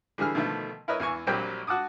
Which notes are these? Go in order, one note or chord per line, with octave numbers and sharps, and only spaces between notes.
D3 E3 G3 G#4 F6
B2 D3 D#3 F3 A3
E4 A#4 B4 C#5 D#5
E2 E3 G#5 C#6
A#1 A#2 F#3 G3 C4 G5
F#4 F#5 A5 D6 D#6